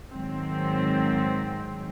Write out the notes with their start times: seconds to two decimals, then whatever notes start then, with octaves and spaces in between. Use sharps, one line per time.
0.12 G#2 D#3 F#3 C4